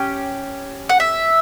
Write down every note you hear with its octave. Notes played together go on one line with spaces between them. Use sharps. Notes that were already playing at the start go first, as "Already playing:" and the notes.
Already playing: C#4 G4
F#5
E5